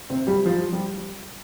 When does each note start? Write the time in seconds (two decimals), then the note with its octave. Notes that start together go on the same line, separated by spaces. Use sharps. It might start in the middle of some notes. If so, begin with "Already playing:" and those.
0.10 C3 C4
0.27 G3 G4
0.46 F3 F4
0.72 G3 G4